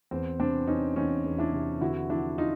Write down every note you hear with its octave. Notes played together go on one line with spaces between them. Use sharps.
E2 C4
C3 C4 D4
E2 C#4 D#4
E2 C#4 D#4
E2
D4 E4
C3
D3 E4 F#4
F3 D4 E4
D#4 F4